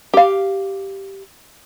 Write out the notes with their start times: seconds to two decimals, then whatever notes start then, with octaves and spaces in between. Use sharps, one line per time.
0.14 G4 F5